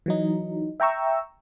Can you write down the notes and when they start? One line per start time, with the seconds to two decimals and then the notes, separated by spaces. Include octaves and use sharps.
0.06 E3 F#3 D#4
0.80 E5 G5 A#5 C#6 E6